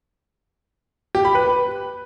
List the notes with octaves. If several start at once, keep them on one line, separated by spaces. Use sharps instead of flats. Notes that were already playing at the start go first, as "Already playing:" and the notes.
G4
B5
B4